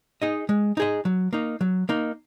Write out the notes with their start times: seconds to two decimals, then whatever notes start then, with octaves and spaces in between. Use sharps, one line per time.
0.22 D#4 G#4 D#5
0.49 G#3
0.77 D#4 G#4 D#5
1.05 F#3
1.33 A#3 D#4
1.61 F#3
1.89 A#3 D#4